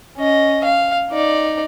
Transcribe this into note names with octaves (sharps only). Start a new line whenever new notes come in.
C#4 D#5
F5
D#4 D5